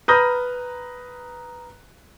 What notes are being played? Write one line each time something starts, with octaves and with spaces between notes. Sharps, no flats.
B4 A#5 D#6 F6 G6 A#6